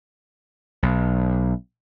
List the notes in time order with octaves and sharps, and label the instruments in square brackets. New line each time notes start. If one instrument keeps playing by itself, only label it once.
[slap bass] B1